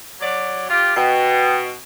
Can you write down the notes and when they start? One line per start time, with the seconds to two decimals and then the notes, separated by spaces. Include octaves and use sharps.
0.21 F#3 D5
0.69 F4 G4
0.96 B2 G5